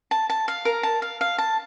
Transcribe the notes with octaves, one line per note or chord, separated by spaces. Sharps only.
A5
A5
F5
A#4
A5
F5
F5
A5